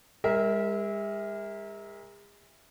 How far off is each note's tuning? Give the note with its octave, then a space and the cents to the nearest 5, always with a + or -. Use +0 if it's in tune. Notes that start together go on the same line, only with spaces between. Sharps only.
G#3 -40 A#4 +0 E5 -20